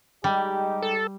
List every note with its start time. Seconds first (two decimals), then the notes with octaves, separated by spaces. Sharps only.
0.24 G3 G#3 D#4 G4
0.82 A4